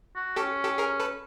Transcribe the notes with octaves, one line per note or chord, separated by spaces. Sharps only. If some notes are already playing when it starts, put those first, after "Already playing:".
F#4
C#4 G4 A4
G4 A4
G#4 A#4
A4 B4